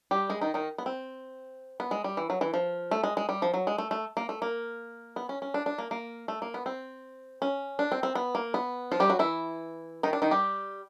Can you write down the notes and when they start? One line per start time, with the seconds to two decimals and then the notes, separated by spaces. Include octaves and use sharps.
0.11 G3 G4
0.30 G#3 G#4
0.41 D#3 D#4
0.54 D#3 D#4
0.78 B3
0.86 C4
1.80 B3
1.91 G#3
2.04 G3
2.17 E3
2.30 F#3
2.41 E3
2.54 F3
2.91 A3
3.04 G#3
3.17 G#3
3.29 G3
3.42 F3
3.54 F#3
3.67 G#3
3.78 A3
3.91 A3
4.17 A#3
4.29 A3
4.42 A#3
5.16 B3
5.29 C#4
5.42 C#4
5.54 D4
5.66 D4
5.78 A#3
5.91 A#3
6.28 A3
6.42 A#3
6.54 B3
6.66 C4
7.42 C#4
7.79 D4
7.92 C4
8.03 C4
8.15 B3
8.35 A#3
8.54 B3
8.92 F3 F4
9.00 G3 G4
9.10 F#3 F#4
9.19 E3 E4
10.03 D#3 D#4
10.13 D4
10.22 D#3 D#4
10.31 G3 G4